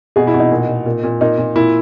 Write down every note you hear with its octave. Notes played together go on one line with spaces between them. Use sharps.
B2 G#4
E4
B2
D#4
A#2
A#2
A#2
A#2
A#2 D#4
A#2
A#2 E4